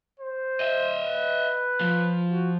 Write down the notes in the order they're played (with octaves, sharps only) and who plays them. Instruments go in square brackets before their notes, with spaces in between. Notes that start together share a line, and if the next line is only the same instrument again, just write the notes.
[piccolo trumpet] C5
[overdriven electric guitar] D#5 E5
[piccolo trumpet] B4
[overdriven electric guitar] F3
[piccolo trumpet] F#4